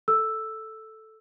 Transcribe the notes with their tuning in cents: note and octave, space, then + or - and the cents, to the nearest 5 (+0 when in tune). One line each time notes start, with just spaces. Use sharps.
A4 +0 E6 +0